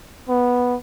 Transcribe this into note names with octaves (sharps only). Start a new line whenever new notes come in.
B3